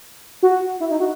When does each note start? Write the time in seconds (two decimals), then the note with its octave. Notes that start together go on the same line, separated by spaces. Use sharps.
0.43 F#4
0.80 E4
0.91 D#4
1.00 F#4